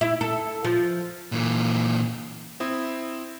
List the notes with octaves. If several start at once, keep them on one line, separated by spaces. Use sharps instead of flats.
E4
A4
F3
A#2 E3
C4 E4 D#6